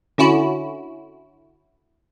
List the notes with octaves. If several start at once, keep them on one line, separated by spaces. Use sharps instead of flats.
D3 C#4 E4 F#4